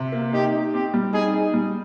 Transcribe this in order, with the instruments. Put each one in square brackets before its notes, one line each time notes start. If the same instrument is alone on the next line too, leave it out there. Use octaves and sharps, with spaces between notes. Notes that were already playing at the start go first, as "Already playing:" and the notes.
Already playing: [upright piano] C3
A#3
[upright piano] D#4 [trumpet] G4
[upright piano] D#4
[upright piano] C4 [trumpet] G4
[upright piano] G3
[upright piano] D#4 [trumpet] G#4
[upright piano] D#4
G3